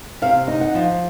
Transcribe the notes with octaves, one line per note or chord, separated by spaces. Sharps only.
C3 F5
D#4
F#5
F3